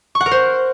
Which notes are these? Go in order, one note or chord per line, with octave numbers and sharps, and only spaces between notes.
C#6
F#5
A#4
C5